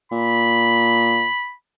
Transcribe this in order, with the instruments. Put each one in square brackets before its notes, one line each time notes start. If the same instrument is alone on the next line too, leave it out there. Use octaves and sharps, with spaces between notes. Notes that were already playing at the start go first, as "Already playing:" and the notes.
[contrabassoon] A#2 [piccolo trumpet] B5